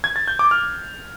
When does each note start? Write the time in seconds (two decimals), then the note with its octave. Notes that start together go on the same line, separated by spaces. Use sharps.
0.04 G#6
0.16 A6
0.28 G6
0.39 D6
0.51 F6